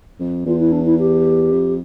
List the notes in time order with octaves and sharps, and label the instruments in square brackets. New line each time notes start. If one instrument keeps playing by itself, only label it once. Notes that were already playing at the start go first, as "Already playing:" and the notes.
[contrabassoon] F2
[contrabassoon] E2 [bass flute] F4
[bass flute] E4
D4
E4
G4
[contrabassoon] F2